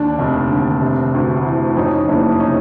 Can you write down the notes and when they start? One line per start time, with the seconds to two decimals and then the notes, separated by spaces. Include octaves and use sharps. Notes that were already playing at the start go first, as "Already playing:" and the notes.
Already playing: D#2 D4
0.19 F1
0.50 D3
0.81 C3
1.14 D2
1.45 E3
1.77 F2 C#4 D#4
2.08 F#1 D4 E4
2.40 C3 C#4 D#4